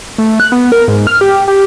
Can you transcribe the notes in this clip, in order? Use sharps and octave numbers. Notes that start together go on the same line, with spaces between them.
A3
F#6
B3
A#4
G#2
F6
G4
G4